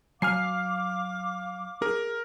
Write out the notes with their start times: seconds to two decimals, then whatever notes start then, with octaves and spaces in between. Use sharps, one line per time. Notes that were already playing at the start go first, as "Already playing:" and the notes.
0.22 F#3 F5 G#5 D6 F6 C7
1.82 G#4 A#4